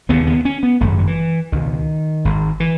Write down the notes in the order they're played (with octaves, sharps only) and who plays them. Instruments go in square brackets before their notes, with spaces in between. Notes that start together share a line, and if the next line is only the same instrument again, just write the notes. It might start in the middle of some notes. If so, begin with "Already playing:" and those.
[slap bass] E1 D#2 C#3 B3
B3
C#4
B3
G#1 F#2 C#3 A3
F#3
E3
C#2 B2 D#3
G#1 G#2
E3